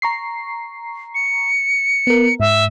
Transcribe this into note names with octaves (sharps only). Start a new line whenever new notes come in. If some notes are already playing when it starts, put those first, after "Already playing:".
A#5 C#6 C7
C#7
B3 A#4
G#2 E5